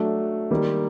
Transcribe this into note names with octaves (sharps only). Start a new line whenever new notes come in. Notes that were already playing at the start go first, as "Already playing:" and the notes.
Already playing: F#3 A3 D4
D#3 G3 A#3